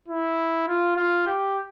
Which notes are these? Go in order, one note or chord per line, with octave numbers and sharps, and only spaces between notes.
E4
F4
F4
G4